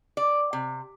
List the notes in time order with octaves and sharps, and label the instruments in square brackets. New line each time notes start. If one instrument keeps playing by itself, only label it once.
[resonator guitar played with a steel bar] D5
C3